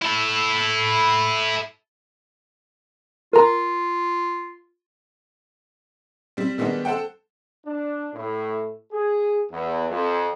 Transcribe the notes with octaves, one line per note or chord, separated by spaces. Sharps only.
E4 A4
F4 A#4 A#5
G3 C4
D#3 G3 G#3 B3 D4 D#4
A4 C5 F#5 G5
D4
A2
G#4
E2
F2